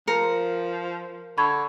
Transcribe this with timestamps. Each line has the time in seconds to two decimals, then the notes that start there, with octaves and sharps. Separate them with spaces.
0.08 F3 A#4 C#7
1.38 D3 B5 C#6 G#6